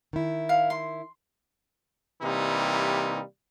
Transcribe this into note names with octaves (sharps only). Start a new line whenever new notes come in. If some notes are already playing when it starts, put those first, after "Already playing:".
D#3 E4
F5
C6
C3 E3 G3 A#3 D#4